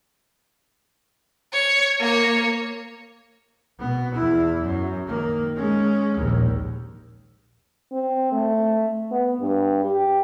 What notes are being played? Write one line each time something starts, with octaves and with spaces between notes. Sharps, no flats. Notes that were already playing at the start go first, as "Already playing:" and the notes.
C#5
A#3 C#5
B2 B3
E2 E4
F#2
D#3 A#3
G#3 C#4
A#1 D#2
C4
A3
B3
G2
G4